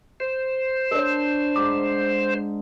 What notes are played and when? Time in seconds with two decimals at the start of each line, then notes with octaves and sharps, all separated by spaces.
0.20 C5
0.91 D4 A#4 C#5
1.56 G#2 D6